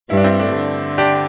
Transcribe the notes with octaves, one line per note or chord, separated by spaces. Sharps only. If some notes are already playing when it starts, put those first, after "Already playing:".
G2 G3 E4
D4
C4 E4
A3 D4
D3
D4 G4